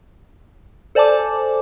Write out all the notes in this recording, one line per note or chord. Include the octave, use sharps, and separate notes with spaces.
A4 C5 D5 G#5 A5 D6